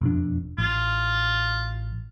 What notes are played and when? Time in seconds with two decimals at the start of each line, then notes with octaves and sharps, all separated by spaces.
0.01 E1 F2 D4
0.58 A1 F4